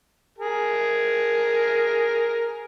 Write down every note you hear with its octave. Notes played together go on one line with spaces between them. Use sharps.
G#4 A#4